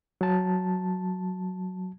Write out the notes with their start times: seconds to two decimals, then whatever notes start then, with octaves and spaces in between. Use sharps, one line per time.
0.21 F#3 A5